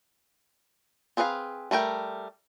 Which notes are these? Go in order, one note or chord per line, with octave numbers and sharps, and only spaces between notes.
C4 G#4 B4 C#5 F5
G3 A3 A#4 G5